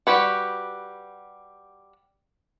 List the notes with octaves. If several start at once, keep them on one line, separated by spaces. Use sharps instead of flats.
G3 F#4 G4 B4 F#5